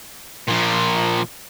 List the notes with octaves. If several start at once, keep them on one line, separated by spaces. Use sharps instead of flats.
A#2 F3